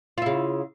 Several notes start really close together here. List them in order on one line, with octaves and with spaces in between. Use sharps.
F4 E4 C#3